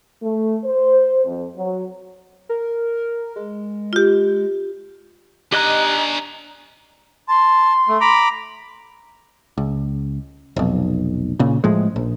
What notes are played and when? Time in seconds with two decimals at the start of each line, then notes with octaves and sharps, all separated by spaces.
0.23 A3
0.64 C5
1.25 F2
1.56 F#3
2.49 A#4
3.36 G#3
3.93 F4 G4
5.52 D4 D#4 G4 D#5 G#5 F#6
7.28 A5 C6
7.88 A3
8.01 A#5 B5 D6
9.58 C#2
10.56 F1 B1
11.39 A#2 C#3
11.64 A2 F3 G#3
11.96 A#1